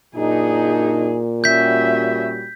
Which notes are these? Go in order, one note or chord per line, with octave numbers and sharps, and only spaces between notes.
F#2 A#2 D4 D#4 G#4
G3 C#4 F#4 E5 G6 B6